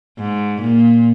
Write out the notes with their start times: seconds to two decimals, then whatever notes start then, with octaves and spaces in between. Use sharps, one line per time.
0.19 G#2
0.61 A#2